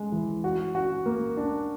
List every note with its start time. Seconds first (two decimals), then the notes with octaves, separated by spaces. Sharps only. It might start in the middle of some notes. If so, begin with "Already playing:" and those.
Already playing: G#3
0.12 E3
0.44 F#4
0.75 F#4
1.06 A#3
1.37 D4